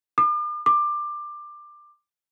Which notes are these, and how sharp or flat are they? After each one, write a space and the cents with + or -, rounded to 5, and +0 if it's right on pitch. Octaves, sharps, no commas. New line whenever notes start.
D6 +40
D6 +20